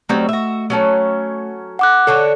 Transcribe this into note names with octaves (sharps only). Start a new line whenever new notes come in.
F#3 G3 A3 C4
F#4 E5
F#3 C#4 A4
F#5 D6 F#6
D3 D4 A4 C#5